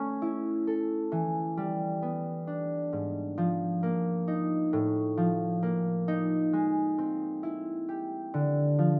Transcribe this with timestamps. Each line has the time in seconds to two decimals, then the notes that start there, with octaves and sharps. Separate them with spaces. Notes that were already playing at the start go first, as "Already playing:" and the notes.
Already playing: A3 C#4
0.22 E4
0.67 A4
1.12 E3
1.57 G3
2.02 B3
2.47 D4
2.93 G#2
3.38 F3
3.83 A#3
4.28 D#4
4.73 A2
5.17 F3
5.63 A#3
6.08 D#4
6.53 G#3
6.98 C4
7.43 E4
7.89 G4
8.34 D3
8.79 F3